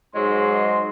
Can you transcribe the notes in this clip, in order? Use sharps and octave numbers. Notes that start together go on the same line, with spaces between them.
G#2 F#3 G#3 C6